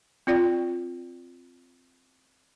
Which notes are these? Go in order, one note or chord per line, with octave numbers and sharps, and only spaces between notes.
C4 F4 D5 G5